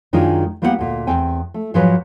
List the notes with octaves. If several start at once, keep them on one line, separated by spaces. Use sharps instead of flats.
F#2 D#3 G#3 D4 D#4 F4
G3 A#3 B3 E4 G4 F#5
D2 A#2
E2 C4 G5 G#5
A3
G#2 F3 F#3 G#3 B4